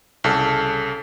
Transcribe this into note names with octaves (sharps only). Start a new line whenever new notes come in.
C2 C#3 A4